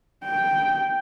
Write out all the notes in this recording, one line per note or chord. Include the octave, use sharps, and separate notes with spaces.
G5